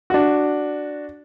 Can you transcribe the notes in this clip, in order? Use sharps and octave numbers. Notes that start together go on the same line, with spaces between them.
D4 F#4